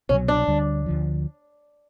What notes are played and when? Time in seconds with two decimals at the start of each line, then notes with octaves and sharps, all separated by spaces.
0.09 C2 B2 F#3 C#4
0.28 D4
0.47 D2 D3 G3
0.86 D2 D3 F3